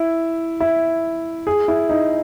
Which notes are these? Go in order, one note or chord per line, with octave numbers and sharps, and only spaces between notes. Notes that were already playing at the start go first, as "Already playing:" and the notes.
Already playing: E4
E4
G#4
E4
D#4